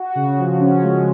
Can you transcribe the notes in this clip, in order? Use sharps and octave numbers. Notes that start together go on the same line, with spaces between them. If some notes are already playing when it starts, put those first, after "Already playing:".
Already playing: F#4
C#3
F3
C#4
G#3